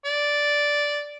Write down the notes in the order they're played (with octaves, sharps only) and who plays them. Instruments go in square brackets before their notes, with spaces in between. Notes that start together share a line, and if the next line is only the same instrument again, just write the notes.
[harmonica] D5